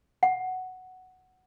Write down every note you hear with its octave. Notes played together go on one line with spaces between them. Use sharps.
F#5